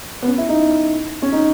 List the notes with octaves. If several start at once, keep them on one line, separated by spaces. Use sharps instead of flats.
B3
C#4
E4
D#4
C#4
D#4